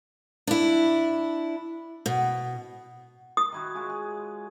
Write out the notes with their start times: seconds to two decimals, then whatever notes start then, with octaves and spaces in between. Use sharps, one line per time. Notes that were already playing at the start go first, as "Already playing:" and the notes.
0.47 D4 E4
2.06 B2
3.37 F#5 D#6
3.52 D#3 E4 F#4
3.75 G#3 F4 C#5
3.90 G#4